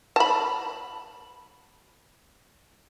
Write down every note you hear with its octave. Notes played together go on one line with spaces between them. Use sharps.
A5 B5